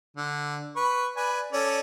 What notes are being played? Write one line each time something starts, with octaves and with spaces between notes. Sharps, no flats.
D3
B4 C#6
B4 D5 G#5
C#4 A4 D5